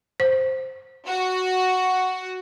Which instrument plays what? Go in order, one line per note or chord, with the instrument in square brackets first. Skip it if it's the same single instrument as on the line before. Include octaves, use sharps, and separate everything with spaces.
[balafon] C5
[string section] F#4